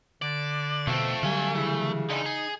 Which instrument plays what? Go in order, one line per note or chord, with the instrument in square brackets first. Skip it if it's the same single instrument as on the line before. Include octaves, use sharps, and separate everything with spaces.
[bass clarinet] D3 [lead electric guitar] D5
[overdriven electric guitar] F2 C4 [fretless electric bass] B2 [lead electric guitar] A3
[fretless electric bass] D3 F#3 G3 [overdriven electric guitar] F5 G#5
[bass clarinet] C#3 [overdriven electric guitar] E3
[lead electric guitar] D3 E3 [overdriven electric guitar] D#4
[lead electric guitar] G#4